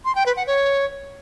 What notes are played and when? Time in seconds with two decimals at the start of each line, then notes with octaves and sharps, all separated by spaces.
0.05 C6
0.15 G5
0.26 B4
0.36 F#5
0.47 C#5